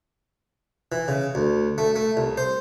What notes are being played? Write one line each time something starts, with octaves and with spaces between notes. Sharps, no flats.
E3
C#3
D2
A3
A3
C2
C5